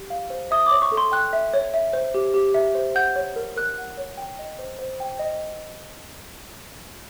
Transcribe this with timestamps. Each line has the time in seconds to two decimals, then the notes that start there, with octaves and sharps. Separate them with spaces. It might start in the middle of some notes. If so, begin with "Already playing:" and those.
Already playing: G4
0.10 F5
0.30 C5
0.51 E5 D#6
0.66 D6
0.71 C#5
0.82 C#6
0.92 A4
0.97 C6
1.12 G5 F#6
1.33 E5
1.54 C#5
1.74 E5
1.93 C5
2.14 G4
2.34 G4
2.54 E5
2.75 C5
2.95 F#5 G6
3.16 C#5
3.36 A#4
3.56 A#4 F#6
3.78 F#5
3.97 C#5
4.17 G5
4.39 D#5
4.59 C5
4.79 C5
5.00 G5
5.19 D#5